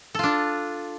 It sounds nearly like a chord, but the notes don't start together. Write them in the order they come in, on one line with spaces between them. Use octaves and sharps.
A4 F4 D4